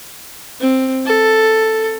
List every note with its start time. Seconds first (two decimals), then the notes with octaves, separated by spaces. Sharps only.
0.60 C4
1.06 A4